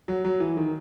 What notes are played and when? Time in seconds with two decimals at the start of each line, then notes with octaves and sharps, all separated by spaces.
0.08 F#3
0.25 F#3
0.40 E3
0.57 D#3